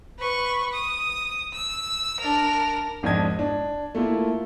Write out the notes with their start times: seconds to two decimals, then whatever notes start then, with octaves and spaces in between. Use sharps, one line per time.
0.19 B4 C#6
0.73 D#6
1.53 E6
2.20 D4 A#4
3.03 G#1 F2 G#2 D4 D#5 G#6
3.39 D4
3.95 A3 A#3 E4 F4